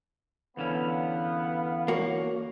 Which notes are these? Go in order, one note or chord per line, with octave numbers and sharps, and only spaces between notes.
E2 D3 B3 C#4 F5
A#3 F#4 C#5